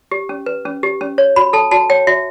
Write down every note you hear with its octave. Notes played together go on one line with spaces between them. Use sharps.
G4
C#4
B4
C#4
G4
C#4
C#5
F#4 B5
A4 A5
F#4 A5
C#5 G5
F#4 E5